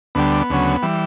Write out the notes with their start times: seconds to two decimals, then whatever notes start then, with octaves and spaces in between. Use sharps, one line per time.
0.15 D2 D3 G3 B3
0.50 D2 C#3 F#3
0.82 E3 G3